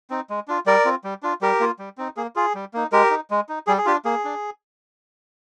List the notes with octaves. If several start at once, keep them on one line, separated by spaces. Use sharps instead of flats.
C4 D#4
G#3
D4 F4
G3 A#4 D5
C4 F4
G3
D4 F4
G3 G4 A#4
A#3 F4
G3
C4 D#4
A#3 G#4
F4 G#4
G3
A#3 D#4
G#3 G4 A#4
D#4
G#3
D#4
G3 G#4
G#4
D4 F4 G4
A#3 G#4
D4